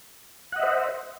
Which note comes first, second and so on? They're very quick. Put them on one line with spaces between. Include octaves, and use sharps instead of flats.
F#5 D#5 E5 C5